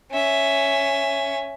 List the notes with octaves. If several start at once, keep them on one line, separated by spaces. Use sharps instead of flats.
C#4 E5